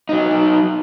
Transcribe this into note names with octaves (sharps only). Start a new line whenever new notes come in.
F#3 D#4